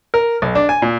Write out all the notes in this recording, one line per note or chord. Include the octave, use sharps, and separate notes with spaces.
A#4
B1
D4
G#5
A#2